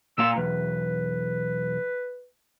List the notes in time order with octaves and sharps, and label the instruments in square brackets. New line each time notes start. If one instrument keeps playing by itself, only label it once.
[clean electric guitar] A#2 A#3 F5 [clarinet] E6
[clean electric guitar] B1 E2 [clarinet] B4